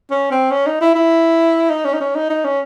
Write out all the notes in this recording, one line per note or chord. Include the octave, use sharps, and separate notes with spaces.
C#4
C4
C#4
D#4
E4
E4
D#4
C#4
D#4
C#4
D#4
D#4
C#4